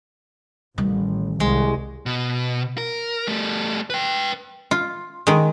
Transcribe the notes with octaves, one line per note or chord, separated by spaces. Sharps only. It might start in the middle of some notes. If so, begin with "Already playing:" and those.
A1 D#3 G3
C2 G#3
B2
A#4
G3 A3
B4 G5
F4
D#3 G#3